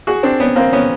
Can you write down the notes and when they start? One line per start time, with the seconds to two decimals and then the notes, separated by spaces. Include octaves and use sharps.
0.07 F#4 G#4
0.23 C4 D4
0.40 B3 C#4
0.56 A#3 C4
0.73 B3 C#4